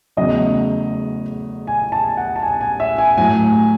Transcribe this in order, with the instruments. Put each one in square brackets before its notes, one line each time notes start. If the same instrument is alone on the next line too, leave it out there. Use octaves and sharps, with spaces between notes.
[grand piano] E2 C#3 F#3 A3 D#5
G#5
A5
F#5
A5
G#5
G#5
E5
G#5
A2 F#3 A3 G#5